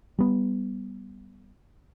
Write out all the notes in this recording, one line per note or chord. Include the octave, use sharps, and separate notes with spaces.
G3 B3